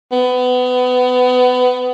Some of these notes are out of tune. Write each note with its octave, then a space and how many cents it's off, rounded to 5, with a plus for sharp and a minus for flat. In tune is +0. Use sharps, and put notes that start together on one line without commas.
B3 +25